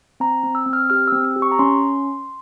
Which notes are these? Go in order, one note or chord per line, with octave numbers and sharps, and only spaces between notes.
C4 A#5
C4
E6
C4
F6
G4 F6
C4 E6
E6
G4
C#6
A#5
C#4 C6